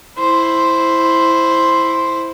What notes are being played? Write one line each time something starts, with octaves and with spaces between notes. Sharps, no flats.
E4 C5